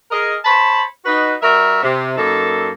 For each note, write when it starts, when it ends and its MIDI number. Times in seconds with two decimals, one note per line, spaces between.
0.11 0.35 68
0.11 0.35 70
0.11 0.35 75
0.45 0.82 72
0.45 0.82 73
0.45 0.82 81
0.45 0.82 83
1.05 1.34 63
1.05 1.34 66
1.05 1.34 71
1.42 1.81 55
1.42 1.81 66
1.42 1.81 70
1.42 1.81 76
1.83 2.13 48
2.17 2.70 42
2.17 2.70 58
2.17 2.70 63
2.17 2.70 69